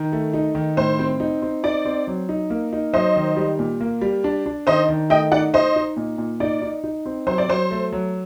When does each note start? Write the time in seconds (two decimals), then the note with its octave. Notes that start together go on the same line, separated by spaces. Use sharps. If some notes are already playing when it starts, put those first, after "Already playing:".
Already playing: D#3
0.13 A3
0.34 D#4
0.55 D#3
0.77 A2 C5
0.99 C4
1.20 D#4
1.42 C4
1.64 D#4 D5
1.85 C4
2.07 F#3
2.29 D#4
2.50 A#3
2.73 D#4
2.93 F#3 C5 D#5
3.16 D#3
3.36 G3
3.59 A#2
3.81 A#3
4.01 G3
4.24 D4
4.46 D4
4.67 D#3 C5 D#5
4.89 D#3
5.10 A3 D#5 G5
5.32 D#4 D5 F#5
5.54 D#4 C5 D#5
5.76 D#4
5.97 A#2
6.18 A#2
6.40 D#4 D5
6.62 D#4
6.84 D#4
7.06 C4
7.27 F#3 C5
7.38 D5
7.48 F#3 C5
7.71 A3
7.93 F#3